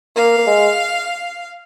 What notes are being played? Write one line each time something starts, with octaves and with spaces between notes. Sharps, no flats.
A#3 F5
A#3
G#3